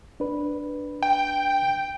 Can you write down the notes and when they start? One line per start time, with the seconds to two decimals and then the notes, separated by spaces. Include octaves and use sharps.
0.20 D4 B4
1.02 G5